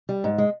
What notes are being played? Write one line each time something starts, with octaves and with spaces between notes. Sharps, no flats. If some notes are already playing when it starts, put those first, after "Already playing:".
G3
G#2
G#3